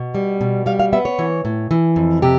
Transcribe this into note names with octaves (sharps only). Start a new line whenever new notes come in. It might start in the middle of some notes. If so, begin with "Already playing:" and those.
Already playing: B2
G3
B2
G3 F5
F5
B3 E5
C#5
E3
A2
E3
F2
C3 G4